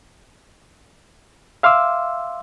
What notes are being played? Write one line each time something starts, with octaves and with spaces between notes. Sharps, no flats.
E5 F5 C6 D6 E6